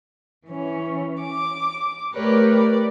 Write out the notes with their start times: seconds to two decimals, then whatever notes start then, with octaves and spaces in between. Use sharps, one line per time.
0.47 E3 C#4
1.21 D6
2.14 A3 G4 A#4 B4 C#5 D5
2.55 D5